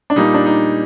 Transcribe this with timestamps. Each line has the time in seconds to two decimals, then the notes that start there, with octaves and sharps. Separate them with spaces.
0.10 D4
0.16 A#2 G3 A#3 D#4
0.34 D4
0.46 D#4